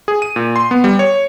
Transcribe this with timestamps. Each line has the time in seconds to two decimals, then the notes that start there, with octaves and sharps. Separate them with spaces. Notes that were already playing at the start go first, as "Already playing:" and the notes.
0.08 G#4
0.22 D#7
0.36 A#2
0.56 C6
0.71 B3
0.84 G3
0.99 C#5